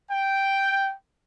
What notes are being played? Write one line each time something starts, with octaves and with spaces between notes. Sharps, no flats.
G5